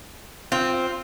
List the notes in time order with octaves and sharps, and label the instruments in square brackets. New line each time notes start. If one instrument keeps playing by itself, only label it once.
[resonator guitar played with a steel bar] C4 [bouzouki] F4